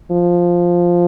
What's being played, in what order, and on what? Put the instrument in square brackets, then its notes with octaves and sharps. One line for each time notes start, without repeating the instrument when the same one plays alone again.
[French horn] F3